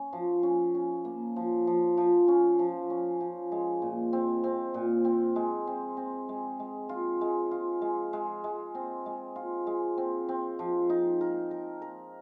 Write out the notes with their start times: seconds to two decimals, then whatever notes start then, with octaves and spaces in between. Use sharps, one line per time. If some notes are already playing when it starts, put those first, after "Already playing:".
Already playing: C#4
0.13 F3
0.43 C#4
0.75 C#4
1.05 A#3
1.36 F3
1.67 F3
1.97 F3
2.28 C#4
2.59 F3
2.90 C#4
3.21 F3
3.52 G#3
3.82 A#2
4.13 C4
4.44 C4
4.74 A#2
5.05 C4
5.36 G#3
5.67 C4
5.97 C4
6.29 G#3
6.60 G#3
6.89 F4
7.21 G#3
7.51 F4
7.82 G#3
8.13 G#3
8.44 G#3
8.75 C4
9.06 G#3
9.36 F4
9.67 G#3
9.98 C4
10.29 C4
10.59 F3
10.90 D#4
11.21 A#4
11.51 A#4
11.82 A#4